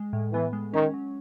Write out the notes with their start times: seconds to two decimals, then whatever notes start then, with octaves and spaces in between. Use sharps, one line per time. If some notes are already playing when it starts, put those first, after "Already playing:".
Already playing: G#3
0.13 A2
0.33 E3 B3
0.53 G#3
0.74 D#3 C#4
0.94 F#3